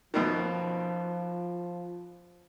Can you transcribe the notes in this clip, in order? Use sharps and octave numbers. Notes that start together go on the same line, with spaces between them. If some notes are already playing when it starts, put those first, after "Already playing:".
F#2 B2 D#3 F3